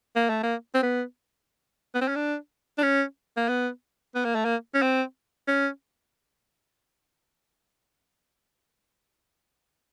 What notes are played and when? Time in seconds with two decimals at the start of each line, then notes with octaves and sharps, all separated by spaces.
0.16 A#3
0.30 A3
0.43 A#3
0.75 C4
0.83 B3
1.95 B3
2.01 C4
2.08 C#4
2.16 D4
2.78 D4
2.83 C#4
3.37 A#3
3.49 B3
4.15 B3
4.25 A#3
4.35 A3
4.45 A#3
4.74 C#4
4.82 C4
5.48 C#4